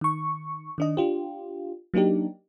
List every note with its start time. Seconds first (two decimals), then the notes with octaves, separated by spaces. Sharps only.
0.01 D#3 C#6
0.78 D#3 D4 D#5
0.97 D4 F4 G4
1.94 F#3 A#3 D4 D#4 G4